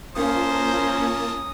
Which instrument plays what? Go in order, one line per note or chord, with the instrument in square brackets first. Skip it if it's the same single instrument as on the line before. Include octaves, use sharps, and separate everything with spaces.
[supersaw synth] A#3 F4 A5 [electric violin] C#4 A#5 [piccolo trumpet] C5 [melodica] D#6